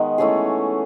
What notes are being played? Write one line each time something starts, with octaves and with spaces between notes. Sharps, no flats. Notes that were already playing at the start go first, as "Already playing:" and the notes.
Already playing: D#3 G#3 B3
E3 A3 C#4 G#4